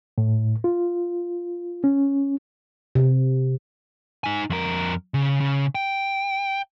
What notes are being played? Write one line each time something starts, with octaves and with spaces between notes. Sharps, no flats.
A2
F4
C#4
C3
D#4 G#5
F2 A#4
C#3
C#3
G5